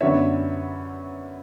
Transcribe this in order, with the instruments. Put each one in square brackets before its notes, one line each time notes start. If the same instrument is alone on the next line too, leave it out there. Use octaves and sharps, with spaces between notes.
[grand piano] F#2 D3 F#3 B3 D4 C#5 E5